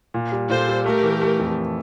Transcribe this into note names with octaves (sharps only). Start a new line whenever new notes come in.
A#2
G3
A#2 A4 C5
G3
A3 G4 A#4
E3
A3
F2